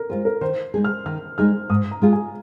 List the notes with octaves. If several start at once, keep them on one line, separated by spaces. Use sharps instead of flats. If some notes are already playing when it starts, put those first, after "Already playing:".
Already playing: A#4
G#3 F4 G#4 C5
A#4
D#3 C5
G#3 D#4 G#4
F6
D#3 F6
G#3 D#4 G#4 F6
G#2 D#6
A#5
G#3 F4 G#4
G#5